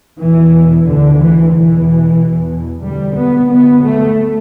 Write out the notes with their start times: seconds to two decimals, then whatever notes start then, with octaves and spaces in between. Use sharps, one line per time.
0.20 E2 B2 E3
0.86 D2 D3
1.19 E3
1.52 E2 B2 E3
2.18 E2 B2
2.84 D2 G3
3.17 B3
3.50 D2 B3
3.83 A3